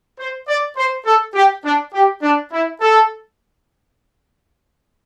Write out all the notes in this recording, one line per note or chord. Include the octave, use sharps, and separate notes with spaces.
C5
D5
C5
A4
G4
D4
G4
D4
E4
A4